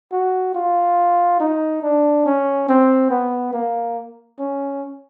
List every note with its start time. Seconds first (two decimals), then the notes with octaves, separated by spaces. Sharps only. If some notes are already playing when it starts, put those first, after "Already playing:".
0.12 F#4
0.55 F4
1.40 D#4
1.83 D4
2.26 C#4
2.68 C4
3.10 B3
3.53 A#3
4.39 C#4